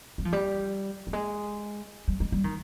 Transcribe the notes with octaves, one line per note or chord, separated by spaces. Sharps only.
G3
F3
G3
G3
G#3
G3
G#3
G3
D#3